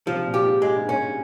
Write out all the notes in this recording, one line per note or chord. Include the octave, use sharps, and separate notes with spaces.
C3 F3
A#2
G4
G#2
G#2 G#3
G2
G#2 C#4